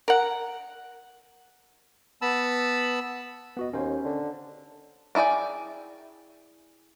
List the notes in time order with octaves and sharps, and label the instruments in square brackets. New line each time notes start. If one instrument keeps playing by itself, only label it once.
[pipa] A#4 F#5
[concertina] B3 A5 B5 E6
[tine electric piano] B3 F#4 D#5
[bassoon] D#2 [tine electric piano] C#4 C5
[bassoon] D3
[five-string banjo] D4 E4 G#4 D5 G5